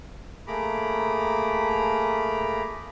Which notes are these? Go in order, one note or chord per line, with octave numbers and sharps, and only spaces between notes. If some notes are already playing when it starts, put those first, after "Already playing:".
A3 A#3 G#4 A#5 B5 D6